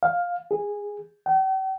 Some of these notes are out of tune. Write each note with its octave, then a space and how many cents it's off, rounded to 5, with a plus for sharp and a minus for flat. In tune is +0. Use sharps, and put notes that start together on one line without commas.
F5 +10
G#4 -15
G5 -45